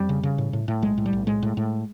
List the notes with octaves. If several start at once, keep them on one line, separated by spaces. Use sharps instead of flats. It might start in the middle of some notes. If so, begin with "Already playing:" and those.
Already playing: F2 G3
C#3
C#3
A2
A2
A2
B1 G#3
A2
G3
B1
A2 G#3
A2
A2